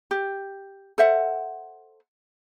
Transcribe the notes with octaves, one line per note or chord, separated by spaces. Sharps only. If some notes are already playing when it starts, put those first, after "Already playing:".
G4
A4 C5 E5 F#5